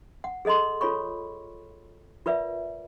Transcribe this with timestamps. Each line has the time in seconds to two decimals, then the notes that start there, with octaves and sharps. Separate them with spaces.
0.24 F#5
0.45 G#4 A4 D#5 A#5 C6
0.81 F4 A4 C#5 B5 C#6
2.26 F4 A#4 B4 D5 E5